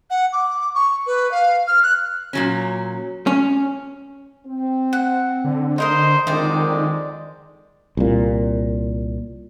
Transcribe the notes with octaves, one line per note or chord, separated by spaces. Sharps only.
F#5
D6
C#6
B4
F5
F6
F#6
A#2 F#3 C#4
C#4
C4
F#5
D3
D#4 A#4 C5 D#5
F2 D3 D#3 G#3 D#4 C5 D5
C2 A#2